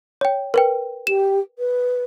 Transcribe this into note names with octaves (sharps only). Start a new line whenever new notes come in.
C#5 G5
A#4 B4 G5
G4 E7
B4